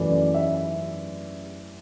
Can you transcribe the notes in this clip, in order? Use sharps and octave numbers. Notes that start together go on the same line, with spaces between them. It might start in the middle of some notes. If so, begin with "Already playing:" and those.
Already playing: F#2 E3 A3 D5
D5
E5